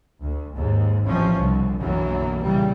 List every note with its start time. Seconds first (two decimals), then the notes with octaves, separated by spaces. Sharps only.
0.21 D2
0.55 D#2 G#2
1.06 A1 C3 E3 F3 C#4
1.37 C2 B2 D3
1.80 B1 F#2 D3 E3 F#3 A#3
2.42 A#2 C#3 E3 G3